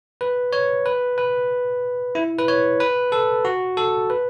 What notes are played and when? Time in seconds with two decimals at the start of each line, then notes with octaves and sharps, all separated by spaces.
0.21 B4
0.53 C#5
0.86 B4
1.18 B4
2.15 E4
2.38 B4
2.48 C#5
2.80 B4
3.12 A4
3.45 F#4
3.77 A4
4.10 B4